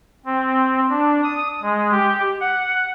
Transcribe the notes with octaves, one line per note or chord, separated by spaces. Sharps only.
C4
D4
D#6
G#3
G4
F#5